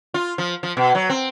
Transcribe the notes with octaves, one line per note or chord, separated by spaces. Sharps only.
F4
F3
F3
B2
F#3
C4